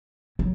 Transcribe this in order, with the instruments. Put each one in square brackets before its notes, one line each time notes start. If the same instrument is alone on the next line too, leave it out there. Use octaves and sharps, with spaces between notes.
[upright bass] F#3